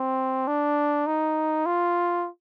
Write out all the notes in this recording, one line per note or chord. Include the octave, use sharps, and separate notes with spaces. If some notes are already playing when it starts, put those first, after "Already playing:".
Already playing: C4
D4
D#4
F4